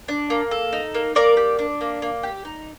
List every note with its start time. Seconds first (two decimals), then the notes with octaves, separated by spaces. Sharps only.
0.08 D4
0.30 A#3
0.51 A4
0.73 D#4
0.94 A#3
1.15 A#3 A#4 D5
1.37 G4
1.59 D4
1.81 A#3
2.02 A#3
2.23 G4
2.45 D#4